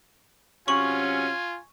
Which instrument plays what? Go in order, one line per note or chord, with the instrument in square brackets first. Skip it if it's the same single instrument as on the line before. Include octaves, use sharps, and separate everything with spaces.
[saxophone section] C3 F#3 C#4 [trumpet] F4 [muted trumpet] G#5 [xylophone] C#6 F#7